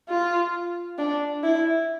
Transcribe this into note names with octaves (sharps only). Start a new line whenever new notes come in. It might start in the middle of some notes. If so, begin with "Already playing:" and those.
F4
D4
E4